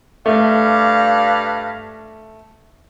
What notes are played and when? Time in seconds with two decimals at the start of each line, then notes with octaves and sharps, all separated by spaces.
0.26 G2 A3 D5 F5